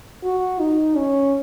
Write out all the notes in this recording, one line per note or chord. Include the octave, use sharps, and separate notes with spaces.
F#4
D#4
C#4